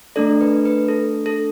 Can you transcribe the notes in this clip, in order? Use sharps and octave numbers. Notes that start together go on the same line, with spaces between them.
A3 D4 A4 D5
B4
B4
A4
A4